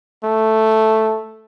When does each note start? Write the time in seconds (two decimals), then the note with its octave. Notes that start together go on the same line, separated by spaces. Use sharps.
0.23 A3